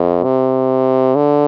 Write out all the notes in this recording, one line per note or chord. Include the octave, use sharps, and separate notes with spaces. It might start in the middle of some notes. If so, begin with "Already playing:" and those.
Already playing: F2
C3
D3